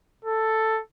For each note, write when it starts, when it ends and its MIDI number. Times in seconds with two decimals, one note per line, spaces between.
0.25 0.81 69